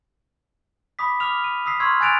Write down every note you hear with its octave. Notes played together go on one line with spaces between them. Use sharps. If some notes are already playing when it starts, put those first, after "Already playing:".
B5 D6 D#6 B6
D6 F6 F7
D#7
D#6 E6 B6 C7
C6 C#6 E6 F6 G#6
G#5 F#6 A6 D7 D#7 F7